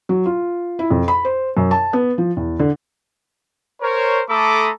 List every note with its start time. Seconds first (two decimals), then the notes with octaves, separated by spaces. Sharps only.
0.09 F#3
0.26 F4
0.79 E4
0.91 F2
1.08 B5
1.25 C5
1.57 F#2
1.71 A5
1.93 B3
2.18 F3
2.37 E2
2.59 D3
3.82 A#4 C5 C#5
4.29 A3 A4 A#5 B5 D6 D#6